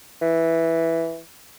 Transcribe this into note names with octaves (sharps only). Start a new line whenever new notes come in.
E3